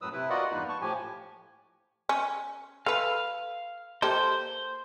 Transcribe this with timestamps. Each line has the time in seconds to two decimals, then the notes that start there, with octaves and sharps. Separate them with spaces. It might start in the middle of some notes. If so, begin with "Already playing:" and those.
0.01 F#2 A2 F#3 B4 D#6 E6
0.13 C3 E4 B4
0.30 F4 F#4 A#4 D5 D#5 F#5
0.51 E2 G2 A#3 D#4 B4
0.69 A5 C#6
0.81 A2 F3 G4 G#5
2.09 C#4
2.86 A4 B4 F5
4.02 A#3 G4 A4 C5